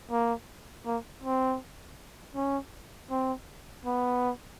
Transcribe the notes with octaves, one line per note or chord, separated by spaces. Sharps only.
A#3
A#3
C4
C#4
C4
B3